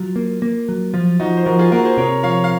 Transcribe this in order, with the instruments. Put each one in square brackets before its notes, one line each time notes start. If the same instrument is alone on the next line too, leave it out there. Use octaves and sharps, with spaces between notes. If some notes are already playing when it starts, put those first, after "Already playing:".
Already playing: [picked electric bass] F#3 [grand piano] F4
[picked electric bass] A#3
A#3
F#3
[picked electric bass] F3 [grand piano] F4
[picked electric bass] F3 [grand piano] D#4 F#4
[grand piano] C5
[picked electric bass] F3 [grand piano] F#4 A#4
[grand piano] F4 G#4
[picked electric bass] A#3 [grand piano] F#4 A#4
[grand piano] G#4 C5
[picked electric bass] C3 [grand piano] A#4 C#5
[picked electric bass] F3 [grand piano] C#5 F5
[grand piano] F5